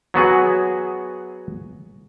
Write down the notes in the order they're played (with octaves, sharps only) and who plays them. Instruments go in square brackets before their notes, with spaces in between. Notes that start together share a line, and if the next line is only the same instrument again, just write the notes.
[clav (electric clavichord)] F#3 B3 F#4 G#4